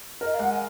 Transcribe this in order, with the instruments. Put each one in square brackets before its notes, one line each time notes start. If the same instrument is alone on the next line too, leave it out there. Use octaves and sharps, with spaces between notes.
[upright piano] A#4 [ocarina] D#5
[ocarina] F5
[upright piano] G#3 [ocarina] F#5
[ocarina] G#5